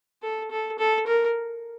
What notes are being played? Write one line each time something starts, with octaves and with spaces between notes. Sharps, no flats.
A4
A4
A4
A#4